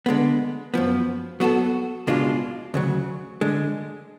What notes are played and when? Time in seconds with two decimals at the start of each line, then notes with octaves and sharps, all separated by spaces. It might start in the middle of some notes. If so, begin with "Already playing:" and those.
0.06 D3 G#3 B3
0.74 F#2 F3 B3
1.40 F#3 B3 F#4 A4
2.07 C#2 B2 G#3 D4 F4
2.74 D2 C#3 F#3
3.41 D3 G#3